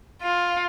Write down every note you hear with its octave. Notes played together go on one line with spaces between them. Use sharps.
F4